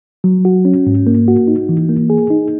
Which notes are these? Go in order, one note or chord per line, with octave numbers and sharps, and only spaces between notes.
F#3
F#4
C#4
G#2
A#3
F#4
D#4
E3
A#3
G#4
D#4